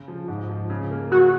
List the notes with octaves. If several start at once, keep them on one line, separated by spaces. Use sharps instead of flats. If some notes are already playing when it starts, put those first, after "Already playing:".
Already playing: C#3
F3
G#2
F3
C#3
A#3
F#3 F#4